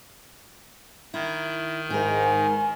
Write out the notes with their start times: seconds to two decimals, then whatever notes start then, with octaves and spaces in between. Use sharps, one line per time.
1.14 D#3 E4
1.90 G#2 D#4 A#4 G#5